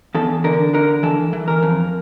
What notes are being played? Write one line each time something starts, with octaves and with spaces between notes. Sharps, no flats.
E2 A4
D3 A#4
D3 A#4
E3 A4
E3
A#4
F2